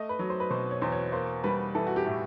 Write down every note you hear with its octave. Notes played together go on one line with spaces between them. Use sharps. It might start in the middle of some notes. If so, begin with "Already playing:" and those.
Already playing: A3 D#5
B4
F#3
C5
B4
B2 C5
C#5
E2 C5
C#5
A#3 C5
G3 B4
E3 A4
F#4
G4
A2